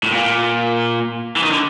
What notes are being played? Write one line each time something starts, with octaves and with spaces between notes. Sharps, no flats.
A2
A#2
E3
D#3
D3